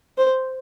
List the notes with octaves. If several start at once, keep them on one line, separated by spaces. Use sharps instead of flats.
C5